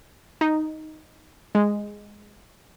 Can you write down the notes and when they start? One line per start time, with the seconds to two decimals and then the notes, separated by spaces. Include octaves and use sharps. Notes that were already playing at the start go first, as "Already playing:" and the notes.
0.41 D#4
1.55 G#3